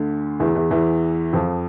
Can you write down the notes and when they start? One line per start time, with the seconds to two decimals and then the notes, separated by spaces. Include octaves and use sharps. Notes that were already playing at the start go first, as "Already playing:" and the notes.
Already playing: D2 D3
0.40 E2 E3
0.55 E2 E3
0.71 E2 E3
1.33 F2 F3